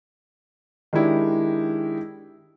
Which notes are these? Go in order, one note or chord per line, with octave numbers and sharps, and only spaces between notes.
D#3 G#3 D4 E4 G4